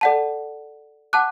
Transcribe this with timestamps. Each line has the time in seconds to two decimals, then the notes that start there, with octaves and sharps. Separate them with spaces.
0.01 A4 D5 F#5 A5
1.13 F#5 A5 D6 F#6